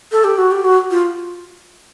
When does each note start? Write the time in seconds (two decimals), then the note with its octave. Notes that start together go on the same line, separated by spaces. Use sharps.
0.12 A4
0.24 G4
0.38 F#4
0.51 G4
0.64 F#4
0.91 F4